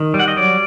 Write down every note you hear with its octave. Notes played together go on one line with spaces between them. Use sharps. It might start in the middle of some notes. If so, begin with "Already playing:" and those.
Already playing: D#3
G3
F#5
D#5
F#3 D5